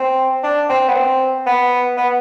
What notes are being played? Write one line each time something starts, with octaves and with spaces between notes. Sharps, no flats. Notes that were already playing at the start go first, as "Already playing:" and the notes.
Already playing: C4
D4
C4
B3
C4
B3
B3